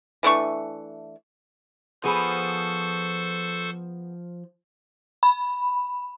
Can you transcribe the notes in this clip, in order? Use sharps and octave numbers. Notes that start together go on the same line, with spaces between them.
E3 A3 D4 C#6
F3 B3 G#4 A4 C5 C#6
B5